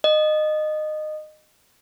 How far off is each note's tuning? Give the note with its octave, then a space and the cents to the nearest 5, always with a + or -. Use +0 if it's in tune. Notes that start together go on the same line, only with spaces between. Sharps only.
D#5 -20